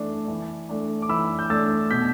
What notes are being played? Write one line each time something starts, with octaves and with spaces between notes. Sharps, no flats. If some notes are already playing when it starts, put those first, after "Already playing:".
Already playing: E3 A3 D4
E3
A3 D4
D6
E3 B5 E6
G6
A3 D4 E6 A6
B2 G6 B6